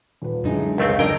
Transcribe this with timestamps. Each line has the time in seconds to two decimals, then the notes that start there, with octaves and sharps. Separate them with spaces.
0.22 D#1 B4
0.44 F#2 D3 G#3 D#4 E4
0.78 C#2 A3 C4 A#4 F5
0.99 F#1 D4 A#4 D#5 G5 E6 G#6